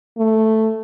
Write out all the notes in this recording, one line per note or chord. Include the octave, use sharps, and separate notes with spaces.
A3